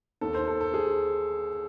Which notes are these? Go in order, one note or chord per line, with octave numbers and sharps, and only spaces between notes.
D#2 D#3 A4
C5
A4
A4
G#4